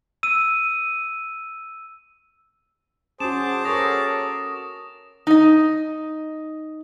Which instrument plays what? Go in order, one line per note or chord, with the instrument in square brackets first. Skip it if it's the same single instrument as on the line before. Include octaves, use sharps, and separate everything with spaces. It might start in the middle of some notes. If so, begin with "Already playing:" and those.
[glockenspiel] E6 D#7
[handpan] C#4 F#4 [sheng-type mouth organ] G#4 A5 D6 [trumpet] C5 [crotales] E7
[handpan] F#4 A4 A#4 [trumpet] C#5 [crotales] D#6 A#6
[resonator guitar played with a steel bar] D#4 D#5